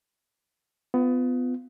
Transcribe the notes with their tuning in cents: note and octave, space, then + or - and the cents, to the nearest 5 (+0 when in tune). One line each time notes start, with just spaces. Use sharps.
B3 +25 F4 +0